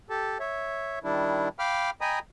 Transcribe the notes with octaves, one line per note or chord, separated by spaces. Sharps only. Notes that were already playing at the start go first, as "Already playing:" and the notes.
G4 A4 A5
C#5 E5
D#3 G3 D4 E4
F5 G5 B5 D6 F6
D#5 G5 G#5 A#5 B5 D#6